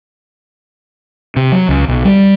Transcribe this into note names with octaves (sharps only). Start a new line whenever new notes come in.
C3
F#3
C#2
B1
G3